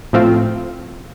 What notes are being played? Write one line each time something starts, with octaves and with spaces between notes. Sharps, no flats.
A2 F3 A3 C4 F4